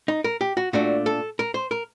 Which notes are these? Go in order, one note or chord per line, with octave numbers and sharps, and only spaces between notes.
D#4
A#4
G4
F#4
A#2 A3 D4 F#4
A4
A#4
C5
A#4